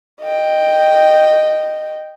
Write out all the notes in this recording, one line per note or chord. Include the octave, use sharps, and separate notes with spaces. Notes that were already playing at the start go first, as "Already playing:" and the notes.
D#5 G5